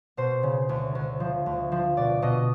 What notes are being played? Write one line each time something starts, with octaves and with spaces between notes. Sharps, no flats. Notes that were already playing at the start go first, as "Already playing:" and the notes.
B2 C5
C#3
D2
D2
F3
D2
F3
B2 D5
B2 D#5